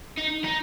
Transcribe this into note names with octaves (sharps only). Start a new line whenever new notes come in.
D#4
D#4